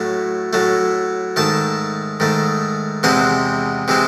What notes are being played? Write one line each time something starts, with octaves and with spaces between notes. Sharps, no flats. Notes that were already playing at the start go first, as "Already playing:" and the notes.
Already playing: A2 F#3 A3
A2 F#3 A3
G#2 D#3 A3 A5
G#2 D#3 A3
E2 C3 E3 G#3 C4 F#5
C3 E3 G#3 C4